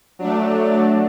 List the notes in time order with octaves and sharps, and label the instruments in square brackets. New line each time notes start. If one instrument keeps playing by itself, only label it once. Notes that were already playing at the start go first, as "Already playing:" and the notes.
[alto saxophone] F#3 [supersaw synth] A3 D4